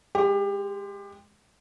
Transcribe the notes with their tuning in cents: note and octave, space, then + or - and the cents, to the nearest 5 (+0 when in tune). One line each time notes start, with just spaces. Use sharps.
G#3 +0 G4 +25